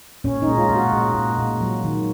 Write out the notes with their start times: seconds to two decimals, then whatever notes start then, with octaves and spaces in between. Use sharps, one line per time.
0.24 A#2 C#4
0.42 D#4
0.47 G#3
0.58 F4
0.70 A#2
0.76 F#4
0.93 A#2
1.15 A#2
1.38 A#2
1.61 F#3
1.84 D#3